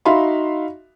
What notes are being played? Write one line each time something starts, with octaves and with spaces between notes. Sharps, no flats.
D#4 F#4 E5 F5 B5 C6